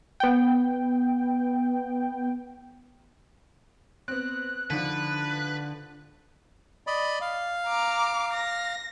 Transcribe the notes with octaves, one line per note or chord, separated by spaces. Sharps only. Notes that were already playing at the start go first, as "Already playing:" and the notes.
B3 G5
B3 C4 F#6
D3 D#3 F3 D4 B4
D5 D#5 B5
F5
A#5 D6
A#6